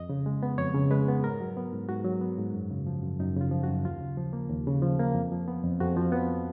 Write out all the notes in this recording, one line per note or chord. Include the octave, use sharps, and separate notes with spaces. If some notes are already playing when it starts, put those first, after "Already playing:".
Already playing: F2 D#5
C#3
G#3
B3
F2 C#5
C#3
G#3 B4
B3
G#2 A#4
F#3
B3
G#2
G#2 F#4
F#3
B3
G#2
F#2
C#3
F3
F#2
F#2 D#4
C#3 F4
F3
F#2 F#4
D#2 F4
C#3
F3
A#3
D#2
C#3
F3
A#3
F2
F3
B3
F2
F2 F#4
F3
B3